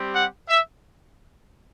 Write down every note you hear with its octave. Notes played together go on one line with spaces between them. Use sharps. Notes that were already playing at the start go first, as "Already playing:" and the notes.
Already playing: G3 C4 G4
F#5
E5